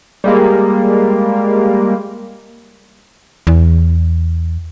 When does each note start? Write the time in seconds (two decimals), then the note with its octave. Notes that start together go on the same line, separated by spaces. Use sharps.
0.24 G3 G#3 A#3
3.47 E2